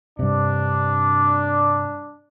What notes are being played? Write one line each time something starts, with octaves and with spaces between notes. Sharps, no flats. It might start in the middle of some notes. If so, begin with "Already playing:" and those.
G2 C3 D4